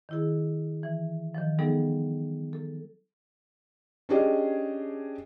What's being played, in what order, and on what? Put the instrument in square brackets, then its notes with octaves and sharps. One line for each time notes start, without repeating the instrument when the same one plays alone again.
[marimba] D#3 E4 G#4
E3
D#3 F3
F#3 G3 B3 D#4 G#4 A4
A4
[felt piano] C#4 D4 G4 G#4 D#5